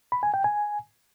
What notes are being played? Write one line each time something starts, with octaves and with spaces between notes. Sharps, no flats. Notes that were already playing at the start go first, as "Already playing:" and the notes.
B5
G#5
G5
G#5